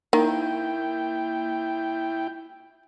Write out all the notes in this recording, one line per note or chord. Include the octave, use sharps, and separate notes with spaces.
D#3 A#3 E4 G5